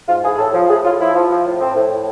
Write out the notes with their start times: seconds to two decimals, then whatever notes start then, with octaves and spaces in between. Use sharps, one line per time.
0.08 G#2 F4
0.23 E3 G#4
0.34 G#4
0.38 A2 A4
0.54 F3
0.69 A2 G#4
0.84 A2 F4
0.99 F3 E4
1.15 F3
1.30 F3
1.45 A2
1.60 A2 C4
1.75 A2
1.91 A2